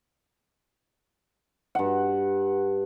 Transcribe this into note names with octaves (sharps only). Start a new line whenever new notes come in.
G2 F#5